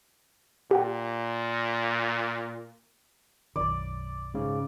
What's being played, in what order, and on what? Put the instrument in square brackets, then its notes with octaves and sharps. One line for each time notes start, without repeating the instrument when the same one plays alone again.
[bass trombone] A#2 [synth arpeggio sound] G4 F#5 G5
[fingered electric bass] B1 F#2 D#3 [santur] D5
[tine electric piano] G#2 C#3